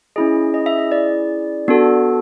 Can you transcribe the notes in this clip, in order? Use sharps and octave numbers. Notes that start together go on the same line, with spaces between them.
C#4 E4 G#4 D#5
D#5
E5
D#5
D5
B3 D4 F#4 A4